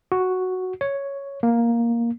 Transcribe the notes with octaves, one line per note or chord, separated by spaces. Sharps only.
F#4
C#5
A#3